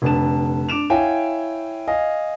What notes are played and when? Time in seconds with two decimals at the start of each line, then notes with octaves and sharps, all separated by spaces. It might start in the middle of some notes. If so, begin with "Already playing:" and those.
0.02 F1 D3 B4 A5 E7
0.69 D4 D6 D7 E7 F7
0.90 E4 C#5 F5 G5 G#5
1.88 D#5 F5 G#5